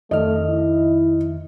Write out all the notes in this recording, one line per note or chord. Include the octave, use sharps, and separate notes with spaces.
F2 D#3 A3 D#5 F6
E4